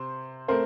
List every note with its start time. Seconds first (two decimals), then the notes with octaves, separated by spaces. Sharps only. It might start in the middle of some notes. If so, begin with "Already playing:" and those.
Already playing: C3 C5
0.48 A3 C4 A#4 C5